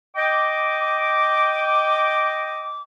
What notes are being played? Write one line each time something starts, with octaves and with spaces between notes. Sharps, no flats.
D#5 G5 D6